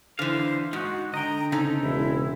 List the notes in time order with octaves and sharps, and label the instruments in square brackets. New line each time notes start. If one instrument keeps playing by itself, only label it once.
[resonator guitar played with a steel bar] D3 E3 [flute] C5 [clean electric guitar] F5
[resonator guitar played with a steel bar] G#2 [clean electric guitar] D#4 [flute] F#4
[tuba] D3 [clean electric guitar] D#5 G5 [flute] A#5
[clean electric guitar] C#3 C4 C#4 [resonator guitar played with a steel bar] D#4 [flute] A4
[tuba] E1 [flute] E4